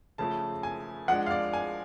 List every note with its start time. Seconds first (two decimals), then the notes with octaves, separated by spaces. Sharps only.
0.18 C#3 F3 A3 A5
0.63 G#5
1.08 F3 G#3 D4 F#5
1.26 F5
1.31 D5
1.53 G#5